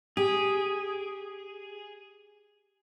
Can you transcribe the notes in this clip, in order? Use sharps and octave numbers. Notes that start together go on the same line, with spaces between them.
G4 G#4